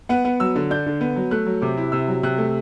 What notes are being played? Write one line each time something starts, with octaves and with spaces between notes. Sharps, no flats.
B3 F#5
B3
F#3 E6
D3
D4 G6
D3
B3
F#3
A3 F#6
F#3
C3 D6
E4
C3 E6
F#3
C3 F#6
A3